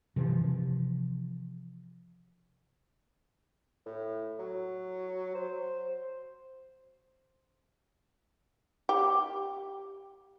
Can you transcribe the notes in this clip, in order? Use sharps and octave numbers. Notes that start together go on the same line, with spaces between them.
C3 E3 F3
A2
F#3
C5
G4